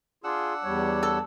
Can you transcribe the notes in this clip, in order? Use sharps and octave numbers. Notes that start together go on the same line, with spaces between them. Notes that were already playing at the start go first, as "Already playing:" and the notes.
D4 F4 G#4 F#5 E6
E2 G3 C#5
A4